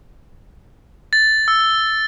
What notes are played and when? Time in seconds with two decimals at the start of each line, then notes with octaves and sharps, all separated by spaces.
1.13 A6
1.48 E6